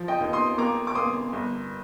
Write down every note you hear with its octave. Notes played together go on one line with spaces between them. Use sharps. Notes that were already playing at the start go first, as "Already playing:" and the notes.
Already playing: F3
D#5 G5
D#2
C6 D#6
A#3 A#5 D6
D6
A#3 C6 D#6
G1